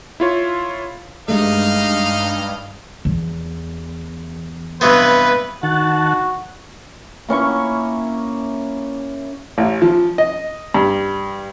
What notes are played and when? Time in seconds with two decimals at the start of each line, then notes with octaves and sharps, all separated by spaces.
0.20 E4 F4 C#5
1.28 G2 G#3 A3 D#4 D#5 F5
3.05 E2
4.81 G2 C3 B3 B4
5.63 D#3 F#4 F#5 A5
7.29 A#3 C#4 E4 C#6
9.58 A1
9.82 F3
10.18 D#5
10.74 G2